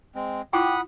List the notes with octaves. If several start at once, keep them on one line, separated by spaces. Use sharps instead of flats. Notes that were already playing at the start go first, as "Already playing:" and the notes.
G#3 C4
E4 F4 F#5 G5 B5 D6 D#6